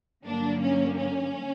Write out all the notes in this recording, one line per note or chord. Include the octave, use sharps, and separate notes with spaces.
G2 D3 F#3 A#3 D4
C#4
C#4